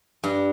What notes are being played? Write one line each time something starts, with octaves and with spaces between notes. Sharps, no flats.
G2